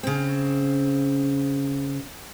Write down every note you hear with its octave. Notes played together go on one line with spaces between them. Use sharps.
C#3 C4